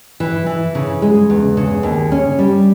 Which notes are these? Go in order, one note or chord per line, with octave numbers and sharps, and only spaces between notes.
E3
E3
C#3
G#3
E2
C#3
D#2
C#4
G3